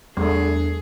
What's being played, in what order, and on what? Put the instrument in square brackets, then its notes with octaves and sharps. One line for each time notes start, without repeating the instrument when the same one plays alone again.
[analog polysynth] E2 [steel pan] G3 A3 [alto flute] D4 [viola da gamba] G#4